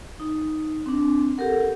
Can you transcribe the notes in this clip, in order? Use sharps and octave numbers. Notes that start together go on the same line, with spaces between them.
D#4
C4 D4
G4 A4 A#4 F#5